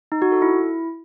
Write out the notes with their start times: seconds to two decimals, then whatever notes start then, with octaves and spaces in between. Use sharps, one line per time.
0.12 D#4
0.22 F#4
0.32 A4
0.42 E4